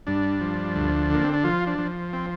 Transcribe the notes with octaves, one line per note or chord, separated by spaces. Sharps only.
G2 D4
F3
D2
D3 A#3
C4
D4
F3 F4
D4
F3
C4